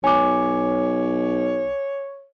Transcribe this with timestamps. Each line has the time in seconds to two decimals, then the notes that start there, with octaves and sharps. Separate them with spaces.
0.04 B1 C#5 G#5 D6